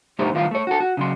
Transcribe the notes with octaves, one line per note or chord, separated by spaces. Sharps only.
B1 G2 A3 D#4 G4 C5
D#2 A2 D#3 F4 F5
A3 C#5
F#4 A4
F#4
C#3 F#3 C6